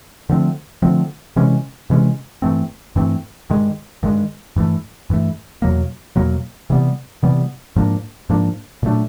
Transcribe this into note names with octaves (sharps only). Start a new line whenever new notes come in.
D3 F3 A3 C4
D3 F3 A3 C4
C3 E3 G#3 C#4
C3 E3 G#3 C#4
G2 E3 A3 C4
G2 E3 A3 C4
G2 D#3 G#3
G2 D#3 G#3
G2 E3 A3
G2 E3 A3
E2 B2 F#3 A#3
E2 B2 F#3 A#3
C3 E3 G3 B3
C3 E3 G3 B3
G#2 F3 A#3 D4
G#2 F3 A#3 D4
A#2 F#3 A3 D4